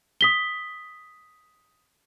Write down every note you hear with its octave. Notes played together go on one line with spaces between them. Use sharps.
D#6 B6 G7